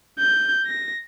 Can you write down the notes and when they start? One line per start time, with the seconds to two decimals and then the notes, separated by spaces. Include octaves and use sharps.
0.19 G6
0.66 A#6